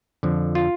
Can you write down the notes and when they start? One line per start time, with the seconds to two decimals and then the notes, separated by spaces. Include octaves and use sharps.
0.23 F2 D3 F3
0.55 F4